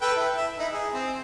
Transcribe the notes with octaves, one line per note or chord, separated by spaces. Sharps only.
A4 B4 G5
E4
E5
D#4 E4
G#4
C4